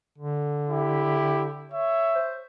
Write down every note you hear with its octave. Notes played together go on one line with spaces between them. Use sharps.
D3
E4 G4
C#5 E5
C5